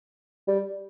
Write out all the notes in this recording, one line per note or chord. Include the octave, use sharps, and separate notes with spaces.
G3